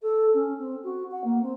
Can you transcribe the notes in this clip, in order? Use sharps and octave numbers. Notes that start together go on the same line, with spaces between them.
A4
C#4
C4
F#4
F#5
A#3
C4